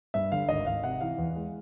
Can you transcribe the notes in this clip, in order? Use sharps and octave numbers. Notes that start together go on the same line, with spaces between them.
G2 E5
D3 F5
G#1 D#5
G#1 F5
C3 F#5
E3 F5
E2
G#3